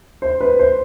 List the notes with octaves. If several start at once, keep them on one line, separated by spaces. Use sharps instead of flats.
C5
B4
C5